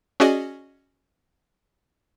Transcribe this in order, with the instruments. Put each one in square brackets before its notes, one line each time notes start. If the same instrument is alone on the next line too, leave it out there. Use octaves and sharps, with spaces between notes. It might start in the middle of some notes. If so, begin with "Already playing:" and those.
[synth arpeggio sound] C#4 F#4 G#4 D5 D#5 G#5